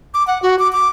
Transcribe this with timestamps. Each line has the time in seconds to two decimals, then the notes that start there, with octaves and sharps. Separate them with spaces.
0.14 D6
0.27 F#5
0.42 F#4
0.59 D6
0.72 D6